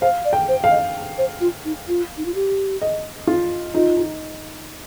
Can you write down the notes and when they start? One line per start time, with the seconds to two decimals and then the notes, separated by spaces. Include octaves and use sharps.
0.01 C5 F5
0.25 D5
0.33 G5
0.48 C5
0.64 F5
0.71 D#5
1.18 C5
1.41 F4
1.65 D#4
1.88 F4
2.17 D#4
2.26 F4
2.35 G4
2.82 D#5
3.27 F4
3.74 D#4 F4
3.97 D#4